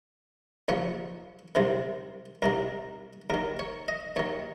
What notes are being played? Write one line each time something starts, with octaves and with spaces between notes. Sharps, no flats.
D#2 C#3 F3 C#5
C2 C3 D#3 C5
C2 C3 D#3 A#4
D#2 D#3 A#4
C#5
D#5
D#2 D#3 C#5